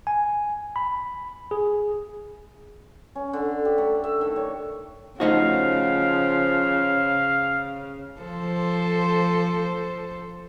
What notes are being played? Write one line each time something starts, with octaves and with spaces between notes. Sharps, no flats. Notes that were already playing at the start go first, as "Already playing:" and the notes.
G#5
B5
G#4
C#4
D3
G4
A3
E5
D#3
C#5
C#3 F3 A3 D#4 F#4 F5
F3 A4 C5